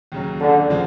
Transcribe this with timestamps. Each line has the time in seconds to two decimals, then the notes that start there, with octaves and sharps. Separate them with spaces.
0.12 D#2 C#3 F#3
0.41 D3
0.70 C#3 F3 G#3 C4